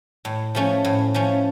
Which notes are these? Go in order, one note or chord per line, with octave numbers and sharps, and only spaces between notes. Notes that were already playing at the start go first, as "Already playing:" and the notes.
A2
F3 A3 C#4
A2
F3 A3 C#4